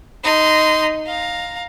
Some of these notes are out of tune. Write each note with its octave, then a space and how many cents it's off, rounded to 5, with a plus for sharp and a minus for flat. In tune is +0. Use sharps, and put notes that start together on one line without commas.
D#4 +0 C6 -20
F5 +15 A#5 +0